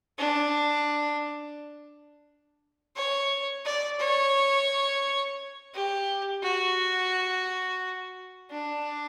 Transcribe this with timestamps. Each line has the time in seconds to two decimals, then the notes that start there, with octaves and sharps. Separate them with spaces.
0.18 D4
2.96 C#5
3.65 D5
4.00 C#5
5.74 G4
6.43 F#4
8.51 D4